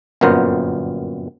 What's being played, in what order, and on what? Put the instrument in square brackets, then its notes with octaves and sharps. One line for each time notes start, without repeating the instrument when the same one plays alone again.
[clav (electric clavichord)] G1 F#2 A#2 B3 A#4 C5